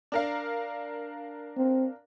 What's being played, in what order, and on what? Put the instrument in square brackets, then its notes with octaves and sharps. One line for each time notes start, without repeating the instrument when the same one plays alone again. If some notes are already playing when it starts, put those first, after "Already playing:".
[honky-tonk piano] D4 A#4 F5
[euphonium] C4